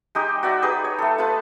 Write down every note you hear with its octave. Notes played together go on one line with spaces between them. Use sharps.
G#3 D#4 G4
F#4 D5 E5
D#4 G4 G#4 B4
C#5
A3 A4
F4 B4 A5